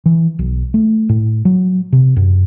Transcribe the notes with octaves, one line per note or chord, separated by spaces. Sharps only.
E3
B1
A3
A2
F#3
C3
F#2